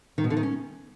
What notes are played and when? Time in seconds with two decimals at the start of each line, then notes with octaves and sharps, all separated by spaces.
0.18 D#3
0.24 B2
0.30 D3
0.37 D#3
0.43 C#4